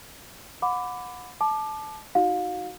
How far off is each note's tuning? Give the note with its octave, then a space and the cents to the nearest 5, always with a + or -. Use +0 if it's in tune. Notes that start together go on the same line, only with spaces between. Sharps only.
F#5 -35 B5 +20 D6 +0
A5 -20 D6 +25
D#4 +25 F#4 +0 F5 +30